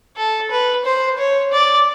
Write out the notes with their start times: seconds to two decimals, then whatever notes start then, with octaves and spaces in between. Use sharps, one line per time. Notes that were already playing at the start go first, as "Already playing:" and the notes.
0.17 A4
0.51 B4
0.85 C5
1.18 C#5
1.52 D5